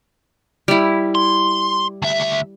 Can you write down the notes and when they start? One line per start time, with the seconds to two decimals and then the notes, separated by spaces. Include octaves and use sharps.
0.68 G3 E4
1.15 C6
2.02 D2 E5